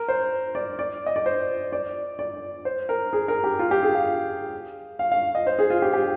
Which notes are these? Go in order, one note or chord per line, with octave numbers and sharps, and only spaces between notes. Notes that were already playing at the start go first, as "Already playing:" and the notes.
Already playing: A#4
C5
D5
D5
D#5
D5
C5
D5
D5
C5
A#4
G#4
A#4
G4
F4
G4
G#4
F5
F5
F5
D#5
C5
G#4
F4
G4
G4